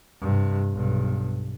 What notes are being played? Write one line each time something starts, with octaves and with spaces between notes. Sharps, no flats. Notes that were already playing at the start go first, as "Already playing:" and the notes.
G2 C3
B1 G2